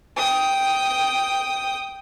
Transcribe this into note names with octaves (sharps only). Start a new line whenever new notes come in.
G5 D#6